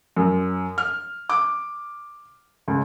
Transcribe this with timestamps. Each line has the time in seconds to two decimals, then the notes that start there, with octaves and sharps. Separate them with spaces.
0.16 F#2
0.78 F6
1.29 D6
2.68 C#2